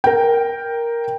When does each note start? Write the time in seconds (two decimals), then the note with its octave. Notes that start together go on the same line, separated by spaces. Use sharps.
0.04 A#4 G5